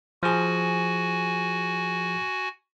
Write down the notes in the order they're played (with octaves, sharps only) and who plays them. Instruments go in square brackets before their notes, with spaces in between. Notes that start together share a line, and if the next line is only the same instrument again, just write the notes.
[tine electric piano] F3 G#4 [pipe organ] F#4 G#5